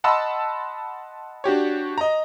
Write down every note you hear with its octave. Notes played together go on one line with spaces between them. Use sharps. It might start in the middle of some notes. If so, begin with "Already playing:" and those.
D#5 F#5 A5 B5 C6 E6
D4 F#4 G4 C#5
D#5 A#5